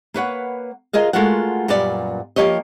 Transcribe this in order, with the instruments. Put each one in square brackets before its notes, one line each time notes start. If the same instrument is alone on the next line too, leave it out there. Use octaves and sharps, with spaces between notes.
[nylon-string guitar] A#3 B4 C#5 F#5
F4 G#4 A#4 D#5 F5
G#3 A3 F4 F#4 A#4 F#5
F#2 A#2 G3 B3 D5
F3 A#3 G4 C#5 D#5